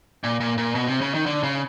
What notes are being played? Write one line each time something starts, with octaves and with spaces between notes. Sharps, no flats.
A#2
A#2
A#2
B2
C3
C#3
D#3
D3
C#3